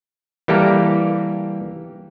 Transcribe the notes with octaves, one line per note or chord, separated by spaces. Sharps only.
E3 G3 A#3 G4 A4 A#4